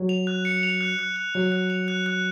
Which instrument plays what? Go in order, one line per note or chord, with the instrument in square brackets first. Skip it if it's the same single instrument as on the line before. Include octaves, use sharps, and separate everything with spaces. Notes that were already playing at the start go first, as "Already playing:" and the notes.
Already playing: [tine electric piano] F#3
[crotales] F7
F#6
C#7
F7
F#6
F#6
F#6
[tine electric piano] F#3 [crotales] F#6
[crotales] F#6
F7
F#6
F#6